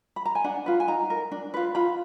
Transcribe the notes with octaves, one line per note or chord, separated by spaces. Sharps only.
B5
A#5
G#5
D4 F#5
F4 B4
G#5
D#4 A#5
A#4
D4
F4 B4
F4 B5